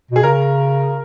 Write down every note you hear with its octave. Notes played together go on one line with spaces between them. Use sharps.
B2 G#4
C#3 A#4